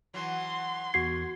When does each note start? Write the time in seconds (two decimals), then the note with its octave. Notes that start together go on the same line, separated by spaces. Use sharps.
0.14 E3 F#3 C6
0.94 E2 F#4 G#6 C7